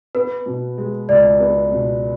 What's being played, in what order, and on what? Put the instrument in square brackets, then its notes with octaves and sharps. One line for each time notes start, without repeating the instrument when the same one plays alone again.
[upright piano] B3 [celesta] B4
[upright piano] B2
G#3
[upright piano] C#2 [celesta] D5
[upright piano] B3
B2